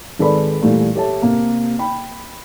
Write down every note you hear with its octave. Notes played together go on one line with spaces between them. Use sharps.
G#1 G#3 A4 B4 D5 B5
A#2 E3 G3 A3 A#3
G4 A4 C#5 E5 A5
C3 A#3
G5 B5